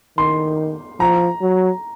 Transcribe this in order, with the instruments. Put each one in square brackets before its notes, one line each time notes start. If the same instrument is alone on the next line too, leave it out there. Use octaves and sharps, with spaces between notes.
[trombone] D#3 [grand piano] C6
[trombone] F3 [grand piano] A#5
[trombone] F#3